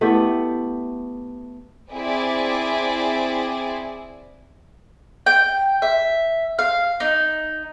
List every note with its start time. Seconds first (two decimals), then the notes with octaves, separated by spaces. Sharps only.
0.01 A3 B3 E4 G4
1.91 C4 E4 G#4 D5
5.26 G5
5.82 E5
6.59 F5
7.00 D#4